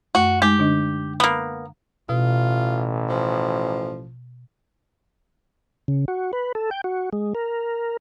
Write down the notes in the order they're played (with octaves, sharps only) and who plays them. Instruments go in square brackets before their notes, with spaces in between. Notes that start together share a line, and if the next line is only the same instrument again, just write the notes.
[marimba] F#2 A3 [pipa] F#4
[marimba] G#3 D#4 G#5 [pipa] G4
[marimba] D3 D4 D#5
[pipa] A#3 B3
[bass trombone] A1 [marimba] B2 [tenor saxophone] F4
[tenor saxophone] F3
[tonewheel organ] C#3
F#4
B4
A4
G5
F#4
G#3
A#4